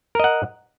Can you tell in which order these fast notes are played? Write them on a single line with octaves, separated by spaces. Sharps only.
A#4 D#5 F#5